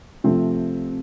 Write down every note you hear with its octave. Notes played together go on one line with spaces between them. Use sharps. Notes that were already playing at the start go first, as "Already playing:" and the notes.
C3 F3 A3 C4